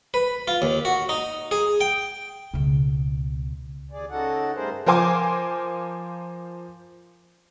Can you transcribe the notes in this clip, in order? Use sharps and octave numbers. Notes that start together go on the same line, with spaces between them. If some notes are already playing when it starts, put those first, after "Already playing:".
B4
F4
D#2
F#4
D#4
G#4
G5
C#2 B2
D#2 G#4 D5
C#3 D#4 F#4 A4 F#5
G2 G3 A3 G#4 A#4 C5
F3 A#4 C5 G#5 D6